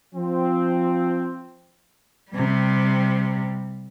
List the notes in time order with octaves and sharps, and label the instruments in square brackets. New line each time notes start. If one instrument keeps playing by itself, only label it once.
[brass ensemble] F3 C4
[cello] C3 G3